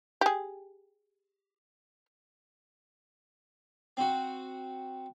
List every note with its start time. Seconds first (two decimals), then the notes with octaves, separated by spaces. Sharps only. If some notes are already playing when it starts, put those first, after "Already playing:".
0.21 G4 G#4
3.97 C4 F#4